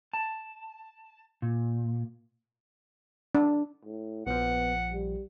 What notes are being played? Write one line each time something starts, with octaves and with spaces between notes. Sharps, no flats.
A5
A#2
D4
A2
A#1 F3 B3 F#5
G3